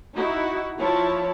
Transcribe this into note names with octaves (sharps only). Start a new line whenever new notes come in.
D#4 E4 F#4
F3 E4 C#5 A5